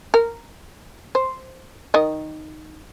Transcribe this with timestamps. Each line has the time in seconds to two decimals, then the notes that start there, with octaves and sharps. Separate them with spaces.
0.14 A#4
1.15 C5
1.94 D#3 D#5